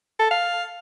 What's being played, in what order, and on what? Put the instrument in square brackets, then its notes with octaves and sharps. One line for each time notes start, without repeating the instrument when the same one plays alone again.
[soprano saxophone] A4
F5